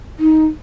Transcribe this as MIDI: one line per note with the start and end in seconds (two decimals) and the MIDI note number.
0.19 0.46 63